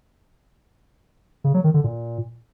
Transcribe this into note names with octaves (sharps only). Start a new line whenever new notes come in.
C#3
F#3
D#3
D3
A#2